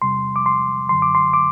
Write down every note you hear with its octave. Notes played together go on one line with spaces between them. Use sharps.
E2 C3 G3 C6
D6
C6
F#2 D3 F#3 C6
D6
C6
D6